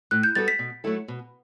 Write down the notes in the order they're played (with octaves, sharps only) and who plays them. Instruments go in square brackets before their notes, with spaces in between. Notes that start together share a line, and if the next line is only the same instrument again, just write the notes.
[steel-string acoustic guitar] A2 [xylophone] F#6
[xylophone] G6
[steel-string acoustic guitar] G3 B3 F#4 A4 [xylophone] A6
[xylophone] B6
[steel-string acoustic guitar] B2
F#3 A3 E4 A4
B2